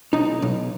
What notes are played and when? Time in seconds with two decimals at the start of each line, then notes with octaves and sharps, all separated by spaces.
0.13 B1 D#4
0.42 B1